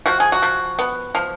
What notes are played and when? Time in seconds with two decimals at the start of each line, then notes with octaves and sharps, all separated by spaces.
0.06 F3 F#4
0.20 G#4
0.32 F#4
0.42 F3
0.79 B3
1.15 F3